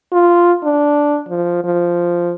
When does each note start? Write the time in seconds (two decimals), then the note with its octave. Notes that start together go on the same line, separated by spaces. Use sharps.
0.13 F4
0.64 D4
1.29 F3
1.64 F3